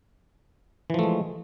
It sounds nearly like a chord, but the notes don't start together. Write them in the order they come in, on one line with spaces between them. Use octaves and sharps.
E3 F3 A3 G#3